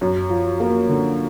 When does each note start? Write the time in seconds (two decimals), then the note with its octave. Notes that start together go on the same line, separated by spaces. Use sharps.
0.01 F#2
0.30 F3
0.60 A#3
0.89 D3